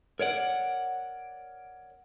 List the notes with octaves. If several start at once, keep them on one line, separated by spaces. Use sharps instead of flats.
A#4 C#5 D5 F#5